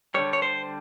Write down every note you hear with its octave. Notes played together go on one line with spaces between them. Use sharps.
D3 G3 C#5
C#5
C5